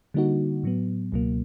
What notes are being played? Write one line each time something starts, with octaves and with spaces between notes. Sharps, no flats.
D3 G3 A#3 D#4 F#4
A2 F#3 B3
C#2 B2 F#3 A#3